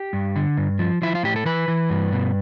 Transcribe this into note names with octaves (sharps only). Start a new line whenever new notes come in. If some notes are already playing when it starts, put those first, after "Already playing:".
Already playing: G4
G2
D3
G2
F3
F3 E4
F4
A2 G4
A4
E3 B4
E3
G2
B2